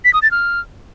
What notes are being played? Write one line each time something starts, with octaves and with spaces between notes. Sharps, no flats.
B6
D#6
A6
F6